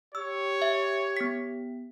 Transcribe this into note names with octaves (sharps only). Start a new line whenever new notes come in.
G4 C#5 E6
E5
B3 B6